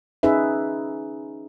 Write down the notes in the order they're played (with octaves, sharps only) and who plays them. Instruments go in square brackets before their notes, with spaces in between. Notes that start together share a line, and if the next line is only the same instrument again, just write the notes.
[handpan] C#4 D#4 G#4 B4 E5